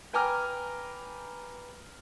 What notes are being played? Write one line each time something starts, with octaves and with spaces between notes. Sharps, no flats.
B4 G5 G#5 A#5 D6 F6